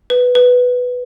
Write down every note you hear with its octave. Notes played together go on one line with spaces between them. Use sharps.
B4
B4